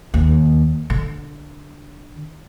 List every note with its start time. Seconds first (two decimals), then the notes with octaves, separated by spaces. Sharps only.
0.14 D#2
0.90 D3